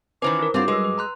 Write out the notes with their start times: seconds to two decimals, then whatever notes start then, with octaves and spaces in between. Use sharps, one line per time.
0.22 D#3 E3 C#4 B4 C5 D6
0.39 E4 A#4
0.54 G2 F#3 C4 F4 D6
0.68 G#3 B4 E6
0.84 B4
0.98 A#5 C6 F#6